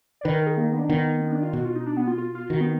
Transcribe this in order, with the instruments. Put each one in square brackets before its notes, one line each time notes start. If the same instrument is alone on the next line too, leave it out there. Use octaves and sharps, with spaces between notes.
[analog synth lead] D5
[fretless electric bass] D#3 [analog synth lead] B4
[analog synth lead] A#4
G#4
A#3
B3
D4
[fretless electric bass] D#3 [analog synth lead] B3
[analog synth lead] B3
D4
F4
[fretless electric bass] B2 [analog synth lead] F#4
[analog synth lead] F4
D#4
D4
B3
F4
F4
F4
[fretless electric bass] D#3 [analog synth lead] F#4
[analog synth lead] B3